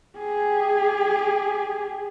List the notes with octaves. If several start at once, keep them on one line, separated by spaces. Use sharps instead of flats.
G4 G#4